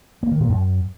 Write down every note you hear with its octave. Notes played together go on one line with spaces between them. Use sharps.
A#3
D#3
A#2
F#2